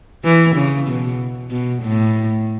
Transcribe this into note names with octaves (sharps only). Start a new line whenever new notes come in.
E3
C#3
B2
B2
A2